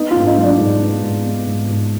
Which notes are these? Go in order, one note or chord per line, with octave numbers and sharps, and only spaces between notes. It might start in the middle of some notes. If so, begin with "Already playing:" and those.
Already playing: B3 D#4
F4
G#2
D#4
F#3
D4
G#2
B3
G#2
B3
G#2
G#2